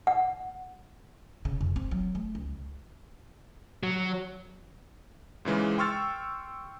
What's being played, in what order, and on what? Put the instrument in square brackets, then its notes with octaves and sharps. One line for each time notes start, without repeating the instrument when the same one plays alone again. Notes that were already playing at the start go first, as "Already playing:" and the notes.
[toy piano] F#5
[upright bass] C#3
F2
C4
F#3
A3
C#2
[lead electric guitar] F#3
[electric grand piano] G#2 C#3 E3 G#3
G5 C6 C#6 E6 F6 A6